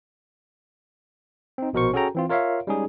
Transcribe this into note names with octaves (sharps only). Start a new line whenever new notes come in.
C4 D#4
A#1 B2 F#4 A#4 C5 C#6
C#4 F#4 G#4 A4 G5 A#5
E3 C4 F4
F4 A#4 C#5 E5 F5
G3 G#3 C#4 D#4 G#4